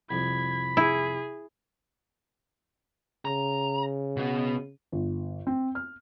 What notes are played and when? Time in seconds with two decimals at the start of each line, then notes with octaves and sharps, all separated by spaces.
0.11 C2 F2 B5 G#6
0.77 E4 G#4
3.25 C#3 A#5
4.17 B2 B3
4.92 G1
5.47 C4
5.75 F6